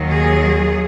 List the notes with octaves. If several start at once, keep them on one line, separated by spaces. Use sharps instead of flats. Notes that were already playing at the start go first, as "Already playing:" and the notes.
Already playing: D#2 D#3 F#3
G#4